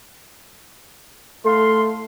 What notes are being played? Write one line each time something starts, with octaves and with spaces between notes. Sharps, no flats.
A2 A3 F5 C6